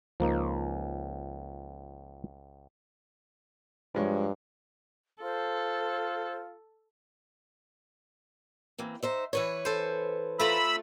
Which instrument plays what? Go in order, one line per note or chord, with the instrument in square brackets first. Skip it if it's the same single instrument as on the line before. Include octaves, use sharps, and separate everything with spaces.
[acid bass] C#2 [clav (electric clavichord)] F3 A#3 D#4
[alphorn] G2 [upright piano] F3 G#3 C#5
[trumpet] F4 [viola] A4 [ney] C5
[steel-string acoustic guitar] E3 A#3 C4
D#4 C5 E5
E3 B4 C#5
[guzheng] A4 C5
[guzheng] A3 F4 A#5 [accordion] B5 E6